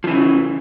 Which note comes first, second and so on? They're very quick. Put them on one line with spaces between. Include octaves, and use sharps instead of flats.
F3 E3 C#3